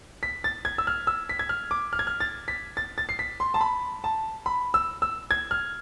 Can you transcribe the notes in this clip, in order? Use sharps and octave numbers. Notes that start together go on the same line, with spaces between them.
B6
A6
G#6
E6
F6
E6
B6
G#6
F6
D6
F6
G#6
F6
A6
B6
A6
A6
C7
B6
C6
A5
B5
A5
B5
E6
E6
G#6
F6